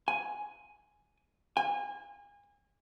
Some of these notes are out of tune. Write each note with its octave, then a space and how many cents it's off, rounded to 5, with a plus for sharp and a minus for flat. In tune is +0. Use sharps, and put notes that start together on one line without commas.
G#5 +5
G#5 -30